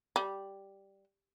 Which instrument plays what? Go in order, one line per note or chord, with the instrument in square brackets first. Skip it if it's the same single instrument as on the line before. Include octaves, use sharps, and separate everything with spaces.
[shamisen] G3